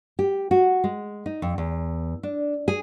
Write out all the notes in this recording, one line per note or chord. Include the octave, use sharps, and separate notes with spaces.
G4
F#4
G#3
D#4
F2
E2
D4
G#4